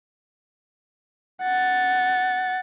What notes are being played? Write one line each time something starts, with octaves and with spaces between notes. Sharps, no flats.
F#5 A6